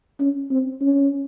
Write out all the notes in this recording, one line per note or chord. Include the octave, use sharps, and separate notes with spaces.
C#4
C4
C#4